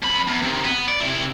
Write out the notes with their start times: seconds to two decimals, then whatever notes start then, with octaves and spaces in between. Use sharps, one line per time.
0.02 F2 B5
0.27 E2
0.42 C3 D#3
0.64 B3
0.88 D5
1.00 C3 E4